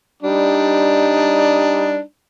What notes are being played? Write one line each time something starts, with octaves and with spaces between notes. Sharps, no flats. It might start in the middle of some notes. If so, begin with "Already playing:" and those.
G3 D4 D#4